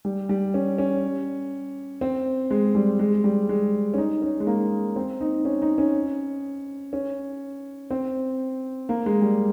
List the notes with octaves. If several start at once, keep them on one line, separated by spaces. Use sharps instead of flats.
G3
G3
C#4
C#4
C4
G#3
G3
G#3
G3
G#3
C#4
D#4
C#4
G#3
A#3
C4
D#4
C#4
D#4
C#4
C#4
C4
A#3
G#3
G3